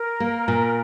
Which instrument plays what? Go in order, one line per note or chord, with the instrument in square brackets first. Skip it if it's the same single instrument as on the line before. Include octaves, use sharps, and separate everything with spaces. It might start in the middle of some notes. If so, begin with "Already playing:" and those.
Already playing: [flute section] A#4
[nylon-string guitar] A#3
A#2